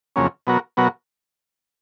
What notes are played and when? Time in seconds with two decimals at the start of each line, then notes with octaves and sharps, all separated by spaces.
0.16 F2 C#3 F#3 A#3 C#4
0.47 B2 F#3 B3 F#4 A#4
0.77 B2 F#3 B3 F#4 A#4